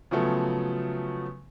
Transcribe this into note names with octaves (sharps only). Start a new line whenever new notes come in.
C#3 F3 F#3 A3 B3